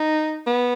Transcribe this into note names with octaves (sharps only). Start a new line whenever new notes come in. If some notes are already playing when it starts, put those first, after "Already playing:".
Already playing: D#4
B3